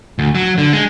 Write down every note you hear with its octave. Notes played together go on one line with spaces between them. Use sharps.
D2
F#3
D3
G#3